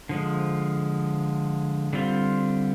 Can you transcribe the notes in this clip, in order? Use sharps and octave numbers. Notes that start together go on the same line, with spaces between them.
D3 F3 G#3
D3 G3 C4 F4